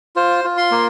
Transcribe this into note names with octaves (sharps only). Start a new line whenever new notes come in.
F4 C5
F4
C6
A#3